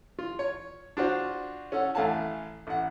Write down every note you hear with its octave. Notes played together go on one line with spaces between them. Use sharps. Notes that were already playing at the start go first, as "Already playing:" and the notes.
F4
C#5
D4 F4 F#4 C5
C#4 A4 F#5
A1 A3 F5 F#5 G#5 A5
A1 F#5